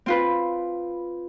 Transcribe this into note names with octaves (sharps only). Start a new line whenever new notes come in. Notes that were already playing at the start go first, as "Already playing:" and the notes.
C4 F4 B4